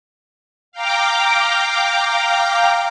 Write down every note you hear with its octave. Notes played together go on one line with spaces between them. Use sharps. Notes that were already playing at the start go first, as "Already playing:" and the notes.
F5 G5 A#5 D6